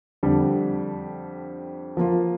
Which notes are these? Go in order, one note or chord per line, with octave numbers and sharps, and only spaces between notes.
F2 D3 G3 D4
F3 A#3 F4